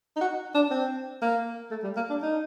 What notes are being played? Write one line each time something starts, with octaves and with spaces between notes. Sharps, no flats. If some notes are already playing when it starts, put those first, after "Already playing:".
D#4
F#4
D4
C4
A#3
A3
G3
A#3
D4
D#4